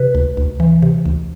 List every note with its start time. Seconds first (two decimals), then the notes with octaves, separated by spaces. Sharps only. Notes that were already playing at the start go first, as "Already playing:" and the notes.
Already playing: C3 B4
0.15 D2
0.37 D2
0.60 E3
0.82 C3
1.06 D2